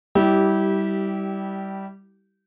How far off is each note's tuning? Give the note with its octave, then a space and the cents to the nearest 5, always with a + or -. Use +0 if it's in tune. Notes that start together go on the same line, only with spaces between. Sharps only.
G3 -5 E4 -25 G4 -20